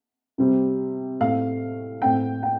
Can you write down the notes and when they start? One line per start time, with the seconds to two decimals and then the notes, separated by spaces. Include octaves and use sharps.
0.38 C3 G3 C4
1.20 A2 A3 C4 F5
2.02 A2 A3 C4 G5
2.43 G5